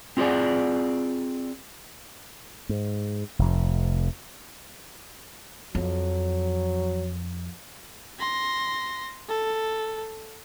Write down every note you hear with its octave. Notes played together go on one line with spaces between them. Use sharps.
C4 F4 G#4 A4 D5 G#5
G#2
F1 F2
F2 F#3
C6 A#6
A4